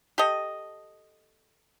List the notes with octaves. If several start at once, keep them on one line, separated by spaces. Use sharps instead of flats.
G4 A4 D#5